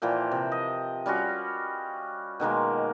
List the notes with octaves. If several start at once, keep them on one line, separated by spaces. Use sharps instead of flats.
A#2 E3 F3 G5
C3
D#5
G3 C#4 F4 F#4
B2 D#3 G#3 A#3